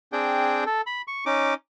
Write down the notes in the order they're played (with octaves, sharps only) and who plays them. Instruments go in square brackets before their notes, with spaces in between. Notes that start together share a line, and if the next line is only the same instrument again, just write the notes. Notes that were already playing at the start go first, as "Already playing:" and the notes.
[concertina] C4 D4 G#4 G5
A4
B5
C#6
C#4 D#4 D6